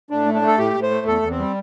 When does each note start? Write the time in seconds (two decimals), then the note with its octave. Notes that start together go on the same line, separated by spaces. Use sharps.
0.10 A2 D4
0.26 A3
0.34 D4
0.42 A3
0.47 A4
0.58 A2 G4
0.74 A2
0.82 C5
0.90 A3
1.06 E2 A4
1.22 E2
1.31 C4
1.39 G3